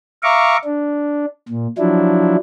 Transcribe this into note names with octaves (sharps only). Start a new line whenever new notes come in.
E5 F5 A#5 C#6 D6
D4
A#2
F3 F#3 D4 E4